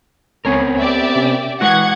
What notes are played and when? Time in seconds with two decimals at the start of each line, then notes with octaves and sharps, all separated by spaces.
0.45 C#2 B3 C4 A#4 C#5 G#5
0.79 G4 D5 E5
1.15 C3 C#4
1.61 E3 G#3 F#4 F#5 C#6 F#6 G#6